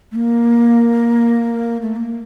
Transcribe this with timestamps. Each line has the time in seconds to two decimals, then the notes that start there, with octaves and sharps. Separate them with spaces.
0.11 A3
0.15 A#3
1.82 A3
1.96 A#3